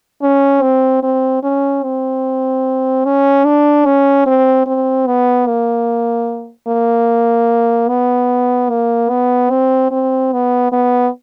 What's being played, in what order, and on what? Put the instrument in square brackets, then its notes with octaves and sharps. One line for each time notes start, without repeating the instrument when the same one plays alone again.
[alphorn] C#4
C4
C4
C#4
C4
C#4
D4
C#4
C4
C4
B3
A#3
A#3
B3
A#3
B3
C4
C4
B3
B3